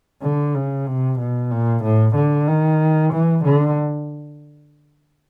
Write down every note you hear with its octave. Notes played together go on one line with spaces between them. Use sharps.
D3
C#3
C3
B2
A#2
A2
D3
D#3
E3
D3